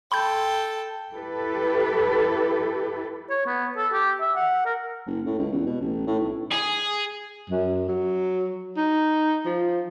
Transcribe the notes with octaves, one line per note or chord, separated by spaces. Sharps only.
A4 G5 B5 C6 G6
E4 G4 A4 B4
C#5
B3
A4
G4
E5
F#5
A#4
F#1
A2
C#2
E2
B2
A1
A2
B1
G#4
F#2
F#3
D#4
F3